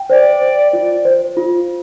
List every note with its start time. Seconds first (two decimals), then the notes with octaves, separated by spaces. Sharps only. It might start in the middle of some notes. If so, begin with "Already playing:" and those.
Already playing: G5
0.10 C5 D5
0.42 C5
0.73 F4
1.05 C5
1.37 F4